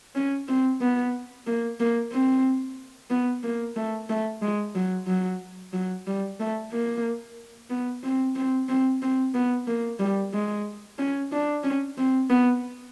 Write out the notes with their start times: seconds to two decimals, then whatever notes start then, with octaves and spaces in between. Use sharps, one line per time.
0.15 C#4
0.48 C4
0.81 B3
1.47 A#3
1.80 A#3
2.13 C4
3.10 B3
3.43 A#3
3.76 A3
4.10 A3
4.42 G#3
4.75 F#3
5.07 F#3
5.73 F#3
6.07 G3
6.40 A3
6.72 A#3
7.70 B3
8.03 C4
8.36 C4
8.69 C4
9.02 C4
9.34 B3
9.67 A#3
9.99 G3
10.33 G#3
10.98 C#4
11.32 D4
11.64 C#4
11.97 C4
12.30 B3